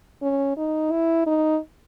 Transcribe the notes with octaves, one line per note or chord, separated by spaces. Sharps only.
C#4
D#4
E4
D#4